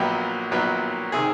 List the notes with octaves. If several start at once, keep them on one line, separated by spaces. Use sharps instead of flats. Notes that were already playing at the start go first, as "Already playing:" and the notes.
Already playing: A#1 A#2 F#3 B3 G4
A#1 A#2 F#3 B3
C3 D#3 G#4